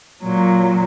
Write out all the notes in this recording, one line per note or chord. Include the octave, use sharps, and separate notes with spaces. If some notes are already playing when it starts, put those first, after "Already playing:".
A#2 F#3